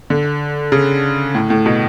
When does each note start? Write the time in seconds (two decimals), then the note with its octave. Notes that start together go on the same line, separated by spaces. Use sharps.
0.10 D3
0.72 C#3
1.35 A2
1.50 A2
1.66 B2